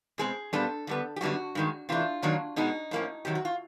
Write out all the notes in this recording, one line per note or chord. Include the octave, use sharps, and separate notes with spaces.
B2 G#3 C4 G#4
A#2 G3 B3 D4 A4
D3 G3 B3
G4
F#2 D3 G3 B3 D4 F#4
G2 D#3 G#3
C3 E3 A3 D4 F4
F#2 D#3 F#3 A#3 D4
B2 G#3 B3 D#4
A2 F3 A#3 C#4
C3 D#3 F#3 G4
F#4
F4